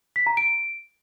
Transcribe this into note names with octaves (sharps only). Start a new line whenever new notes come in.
B6
A#5
D7